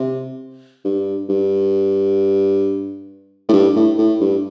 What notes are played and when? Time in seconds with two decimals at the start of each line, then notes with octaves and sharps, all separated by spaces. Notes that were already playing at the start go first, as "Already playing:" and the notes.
Already playing: C3
0.85 G2
1.29 G2
3.49 A2
3.53 G2
3.76 A2
3.98 A2
4.21 G2